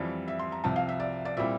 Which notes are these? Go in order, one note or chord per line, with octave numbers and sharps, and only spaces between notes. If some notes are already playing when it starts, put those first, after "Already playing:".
Already playing: F2 E3 G3 C4 D5
E5
C6
A#5
C2 C3 F3 A5
F5
E5
D5
D5
A#2 G3 C4 E4 E5